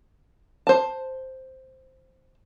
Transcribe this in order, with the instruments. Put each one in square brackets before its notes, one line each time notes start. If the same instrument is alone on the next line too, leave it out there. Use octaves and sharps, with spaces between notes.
[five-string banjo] C5 A5